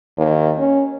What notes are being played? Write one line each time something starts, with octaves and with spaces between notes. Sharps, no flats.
D#2
C#4